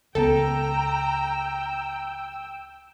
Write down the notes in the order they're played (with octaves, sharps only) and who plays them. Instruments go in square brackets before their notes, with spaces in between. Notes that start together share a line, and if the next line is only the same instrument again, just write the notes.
[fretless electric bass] C#2 B3 [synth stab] A4 [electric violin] G5 E6 [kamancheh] A#5